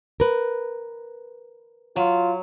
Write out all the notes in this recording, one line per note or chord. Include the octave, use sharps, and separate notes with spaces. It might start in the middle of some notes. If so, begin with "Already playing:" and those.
A#4 B4
F#3 F4